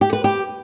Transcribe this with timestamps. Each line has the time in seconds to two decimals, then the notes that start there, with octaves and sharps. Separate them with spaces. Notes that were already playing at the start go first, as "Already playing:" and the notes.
0.01 G4
0.13 B4
0.24 G4